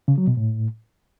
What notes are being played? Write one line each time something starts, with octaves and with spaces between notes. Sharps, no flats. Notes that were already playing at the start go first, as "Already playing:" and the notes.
C#3
F#3
B2
A2